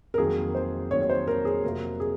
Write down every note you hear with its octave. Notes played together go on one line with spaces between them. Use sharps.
A#4
F2 D#3 F#3 A#3 G#4
C5
F2 D#3 F#3 A#3 C#5
C#5
C5
A#4
G#4
F2 C3 F#3 A#3 F4 A#4
G#4